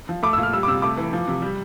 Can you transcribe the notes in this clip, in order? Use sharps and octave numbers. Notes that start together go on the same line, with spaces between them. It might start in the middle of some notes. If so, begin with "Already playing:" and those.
F3
A3 D6
E6
A#2
F6
G3 E6
D6
C3 E6
A3 D6
E3
F3
C3
G3